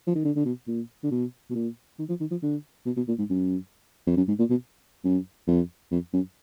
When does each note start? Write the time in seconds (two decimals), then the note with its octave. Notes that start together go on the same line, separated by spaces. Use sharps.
0.07 F3
0.15 D#3
0.24 D3
0.36 D3
0.45 B2
0.67 A#2
1.03 D3
1.11 B2
1.50 B2
1.55 A#2
1.99 D#3
2.09 F3
2.20 D#3
2.31 F3
2.42 D3
2.86 B2
2.96 B2
3.08 A#2
3.18 G#2
3.30 F#2
4.07 F2
4.17 F#2
4.28 G#2
4.39 A#2
4.50 B2
5.04 F#2
5.47 F2
5.91 F2
6.13 F#2